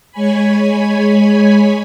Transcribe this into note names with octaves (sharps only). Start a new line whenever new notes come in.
G#3 C#5 G#5 B5